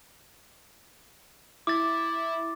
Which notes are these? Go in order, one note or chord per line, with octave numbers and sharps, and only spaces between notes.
E4 D6 A6